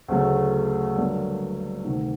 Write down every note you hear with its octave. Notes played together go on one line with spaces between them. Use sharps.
D2 C#3 F#3 A3
G2 D3 F#3 A#3
D2 C3 D#3